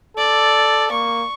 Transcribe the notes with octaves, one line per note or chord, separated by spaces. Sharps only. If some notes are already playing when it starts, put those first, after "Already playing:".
A4 D5
A#3 C#6